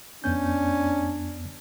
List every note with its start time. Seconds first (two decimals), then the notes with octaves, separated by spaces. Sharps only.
0.24 F2 B3 C#4 D4 G6